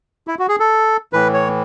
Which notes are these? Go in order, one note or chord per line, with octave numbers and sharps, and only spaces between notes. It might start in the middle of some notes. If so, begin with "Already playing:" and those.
E4
F#4
G#4
A4
A2 E3 B4
C#5